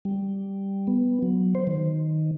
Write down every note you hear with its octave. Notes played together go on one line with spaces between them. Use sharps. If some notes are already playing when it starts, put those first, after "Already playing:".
G3
B3
F#3
C5
D#3